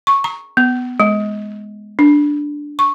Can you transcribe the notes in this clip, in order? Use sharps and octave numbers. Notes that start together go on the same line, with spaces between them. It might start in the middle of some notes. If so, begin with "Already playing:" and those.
C#6
A#5
B3
G#3
D4
C#6